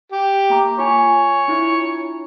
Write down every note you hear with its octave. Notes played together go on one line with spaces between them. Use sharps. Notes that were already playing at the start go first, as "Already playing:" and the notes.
G4
A#3 A#5 D6
F4 C#5 G#5
G#5
D4 E4 F4